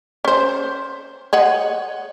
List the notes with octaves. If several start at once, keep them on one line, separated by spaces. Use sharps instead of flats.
C#4 C5
C#5 D#5 F#5